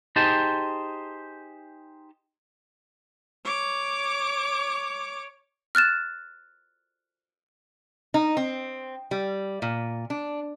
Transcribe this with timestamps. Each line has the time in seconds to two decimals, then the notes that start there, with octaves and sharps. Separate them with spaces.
0.16 D#4 G4 G#4 C5 A5
3.44 C#5 D6
5.75 F6 F#6 A6 E7
8.14 D#4
8.37 C4
9.11 G3
9.62 A#2
10.10 D4